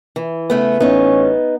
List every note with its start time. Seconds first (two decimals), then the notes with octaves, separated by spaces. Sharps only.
0.16 E3
0.50 C#3 A3 B3
0.80 A1 B3 C#4 D#4